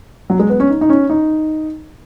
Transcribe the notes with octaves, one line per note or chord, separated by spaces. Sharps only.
F#3
G#3
B3
C#4
D#4
D#4
C#4
D#4